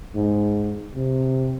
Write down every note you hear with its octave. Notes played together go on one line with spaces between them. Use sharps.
G#2
C3